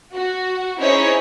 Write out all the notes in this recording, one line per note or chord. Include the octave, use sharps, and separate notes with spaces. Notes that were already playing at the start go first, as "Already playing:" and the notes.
F#4
C#4 D#4 E4 G#4 C5 C#5